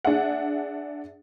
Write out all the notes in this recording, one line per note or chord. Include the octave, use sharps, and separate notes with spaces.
D4 G#4 E5 F#5